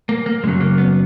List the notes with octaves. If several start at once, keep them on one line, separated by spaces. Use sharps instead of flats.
A#3
A#3
F#2 C#3 F#3 G#3
A#3
B3